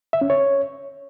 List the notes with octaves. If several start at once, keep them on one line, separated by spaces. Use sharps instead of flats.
E5
C#4
C#5